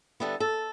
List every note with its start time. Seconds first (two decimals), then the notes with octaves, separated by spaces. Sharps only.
0.20 D3 G3 B3 E4 A4
0.40 A4